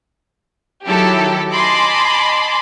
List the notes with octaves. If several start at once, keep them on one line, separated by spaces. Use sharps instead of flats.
D#3 F#3 E4 G4 A4
D#5 G#5 A5 B5 C6 D6